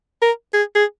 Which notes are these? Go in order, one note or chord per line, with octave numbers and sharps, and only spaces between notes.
A#4
G#4
G#4